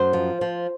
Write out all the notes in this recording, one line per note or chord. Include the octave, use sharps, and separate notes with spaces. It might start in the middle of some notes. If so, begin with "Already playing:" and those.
Already playing: F#2 C5
F3
F3